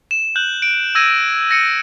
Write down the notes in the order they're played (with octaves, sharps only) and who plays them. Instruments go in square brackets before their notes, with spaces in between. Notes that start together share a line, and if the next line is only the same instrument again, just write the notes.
[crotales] E7
F#6 G6 F#7
D7
E6 G#6 A#6 D#7 E7
A#6 C#7 D#7